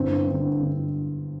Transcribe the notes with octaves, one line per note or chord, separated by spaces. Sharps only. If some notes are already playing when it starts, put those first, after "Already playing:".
Already playing: G1 G2 C4
G2
D3
G2
D3